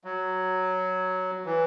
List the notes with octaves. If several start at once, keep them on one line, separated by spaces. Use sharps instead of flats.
F#3
E3